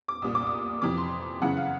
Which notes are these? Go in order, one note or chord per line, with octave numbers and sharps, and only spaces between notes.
D6
C2 A#2 D#6
D6
D#6
F2 C3 E3 D6
C6
F#2 C#3 E3 F#5
F5